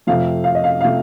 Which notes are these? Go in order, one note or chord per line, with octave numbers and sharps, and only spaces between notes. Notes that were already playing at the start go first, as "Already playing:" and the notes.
F2 C3 F3 A3 F5
F5
D#5
F5
C3 F3 A3 F5